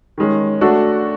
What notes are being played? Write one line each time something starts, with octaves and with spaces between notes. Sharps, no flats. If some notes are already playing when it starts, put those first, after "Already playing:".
D#3 G#3 C#4
A3 D4 F#4 A4